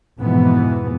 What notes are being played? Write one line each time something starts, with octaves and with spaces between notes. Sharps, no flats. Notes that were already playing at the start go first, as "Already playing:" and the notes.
F2 G#2 B2 E3 B3